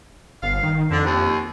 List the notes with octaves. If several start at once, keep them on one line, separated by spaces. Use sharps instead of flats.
G1 F5
D#3
F2 D3
D#2